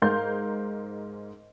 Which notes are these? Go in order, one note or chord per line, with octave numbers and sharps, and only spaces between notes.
G#2 G#3 A#4 F5 C6 G6